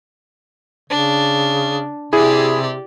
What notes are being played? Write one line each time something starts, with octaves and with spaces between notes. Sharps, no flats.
C#3 D4
C3 E4 G4 G#4 D5